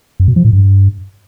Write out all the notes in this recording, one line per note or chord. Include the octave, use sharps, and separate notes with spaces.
F#2
B2
F3
A2
G2